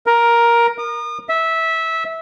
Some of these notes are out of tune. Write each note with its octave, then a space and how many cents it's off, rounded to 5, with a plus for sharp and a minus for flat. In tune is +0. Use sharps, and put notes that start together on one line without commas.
A#4 +10
D#6 -40
E5 -15